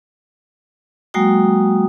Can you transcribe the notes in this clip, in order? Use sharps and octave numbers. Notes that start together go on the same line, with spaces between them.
F#3 G#3 A#3 F#4 G5 D#6